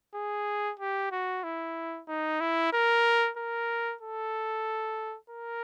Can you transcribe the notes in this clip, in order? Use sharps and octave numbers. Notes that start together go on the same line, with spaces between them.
G#4
G4
F#4
E4
D#4
E4
A#4
A#4
A4
A#4